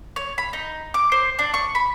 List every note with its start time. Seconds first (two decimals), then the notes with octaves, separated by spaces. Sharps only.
0.16 C#5
0.38 B5
0.53 D#4
0.94 D6
1.12 C5
1.39 D4
1.54 C#6
1.75 B5